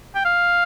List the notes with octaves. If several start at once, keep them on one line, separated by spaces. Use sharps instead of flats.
G5
F5